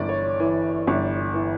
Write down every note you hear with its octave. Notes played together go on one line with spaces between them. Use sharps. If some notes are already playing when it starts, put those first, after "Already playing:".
Already playing: G1 E3 D5
C#5
E3
G1
E3